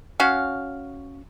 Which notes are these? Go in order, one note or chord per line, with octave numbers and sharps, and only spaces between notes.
C#4 F#4 F5